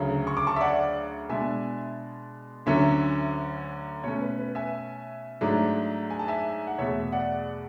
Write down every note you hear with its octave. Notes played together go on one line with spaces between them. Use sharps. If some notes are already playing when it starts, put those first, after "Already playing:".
Already playing: D2 C#3 F#3
C#6
D6
A5 C#6
E5
D5 F#5
B2 G#3 D4 E5 G#5
D2 D3 F#3 C#4 C#5 E5
B2 A3 C#4 C#5
B4
B4
E5 G#5
G#2 F#3 A3 D4
G#5
A5
E5 G#5
F#5
E2 B2 A3 C#5 E5
D5 F#5